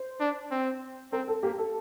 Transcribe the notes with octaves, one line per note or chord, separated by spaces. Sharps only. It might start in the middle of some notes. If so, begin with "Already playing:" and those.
Already playing: C5
D4
C4
C4 A#4
A4
A#3 G4
A4